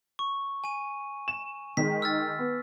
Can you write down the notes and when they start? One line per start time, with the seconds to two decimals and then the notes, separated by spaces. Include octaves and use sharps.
0.19 C#6
0.64 G#5 D#7
1.28 E7
1.77 D#3 G#3 B6
2.02 E6 F6 A6
2.39 B3